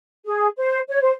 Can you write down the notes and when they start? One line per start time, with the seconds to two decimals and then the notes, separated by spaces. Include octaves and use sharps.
0.25 G#4
0.57 C5
0.88 C#5
1.01 C5